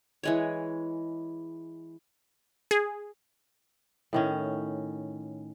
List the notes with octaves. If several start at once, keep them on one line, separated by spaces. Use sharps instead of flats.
E3 G#3 C#5
G#4
A2 D#3 C#4